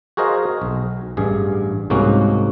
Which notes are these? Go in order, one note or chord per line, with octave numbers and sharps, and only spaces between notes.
F#4 G#4 A#4 C5 D#5 F5
B1
A1 G2 G#4
C2 G#2 A#3 C#4 F#4